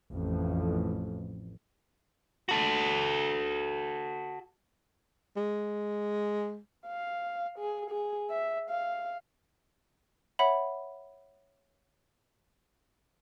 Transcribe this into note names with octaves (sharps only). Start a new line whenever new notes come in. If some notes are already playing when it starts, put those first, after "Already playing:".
A1 F2
F#4 A4
G#3
F5
G#4
G#4
E5
F5
C#5 E5 F#5 B5